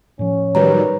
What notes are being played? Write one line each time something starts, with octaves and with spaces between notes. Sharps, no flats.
A2 F3 C#4
D#3 F#3 G3 B4 C#5 A#5